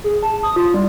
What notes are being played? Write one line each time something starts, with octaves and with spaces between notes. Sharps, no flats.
G#4
A5
D#6
F4
G3